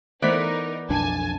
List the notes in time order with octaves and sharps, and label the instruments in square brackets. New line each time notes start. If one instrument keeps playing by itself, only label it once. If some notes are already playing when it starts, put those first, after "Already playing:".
[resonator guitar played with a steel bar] E3 B3 D5 [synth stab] A3 C5 B6 [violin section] D#4 A#4
[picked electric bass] B1 F2 D4 [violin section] G#5 A5